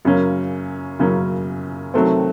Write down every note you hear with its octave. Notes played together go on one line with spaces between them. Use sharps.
F#2 C#3 F#3 A#3 C#4
F#2 C#3 F#3 A#3 C#4
C3 D#3 F#3 A3 C4